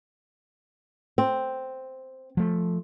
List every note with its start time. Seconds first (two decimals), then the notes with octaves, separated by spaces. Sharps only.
1.18 C4
2.37 F3 A3